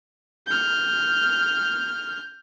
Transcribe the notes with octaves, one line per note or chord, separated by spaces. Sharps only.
F6 G6